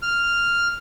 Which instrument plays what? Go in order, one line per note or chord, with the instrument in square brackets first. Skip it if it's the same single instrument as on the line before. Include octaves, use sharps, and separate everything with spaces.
[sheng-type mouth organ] F6